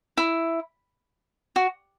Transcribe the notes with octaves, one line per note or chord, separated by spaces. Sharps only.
E4
F#4